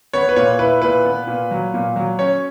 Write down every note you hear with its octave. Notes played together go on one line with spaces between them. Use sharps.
B3 C#5
B4
A#2 C#5
E4 B4
A#2 B4
B3
A#2
F#3
A#2
F#3
C#4 C#5